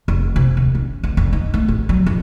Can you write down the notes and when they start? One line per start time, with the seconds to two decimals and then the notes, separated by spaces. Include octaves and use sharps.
0.08 F1
0.36 C3
0.57 D#2
0.75 C#4
1.03 D2
1.17 F1
1.33 D#4
1.54 A3
1.68 A1
1.89 F#3
2.06 F2